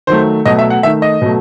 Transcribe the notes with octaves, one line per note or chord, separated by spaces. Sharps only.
D#3 F#3 A3 C5
B2 F#3 A3 D#5
E5
F#5
D#3 A3 E5
D#5
B2 F#3 A3